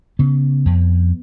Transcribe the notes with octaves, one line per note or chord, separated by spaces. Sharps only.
C#3 B3
F2